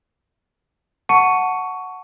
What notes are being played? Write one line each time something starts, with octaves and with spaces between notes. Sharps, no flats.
F#5 A5 C#6 C#7 D#7